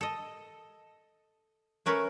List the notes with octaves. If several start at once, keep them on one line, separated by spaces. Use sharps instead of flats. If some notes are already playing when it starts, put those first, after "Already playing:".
A4 D#5
A3 C#4 A#4 B4 C#5